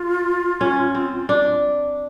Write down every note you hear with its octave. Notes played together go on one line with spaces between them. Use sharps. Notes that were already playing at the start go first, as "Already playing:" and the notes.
Already playing: F4
C#4
C4
D4